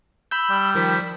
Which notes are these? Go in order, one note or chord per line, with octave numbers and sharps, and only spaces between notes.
B5 E6 G6
G3
D#3 F3 B6